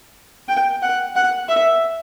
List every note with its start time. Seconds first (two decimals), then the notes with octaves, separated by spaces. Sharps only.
0.48 G5
0.82 F#5
1.16 F#5
1.49 E5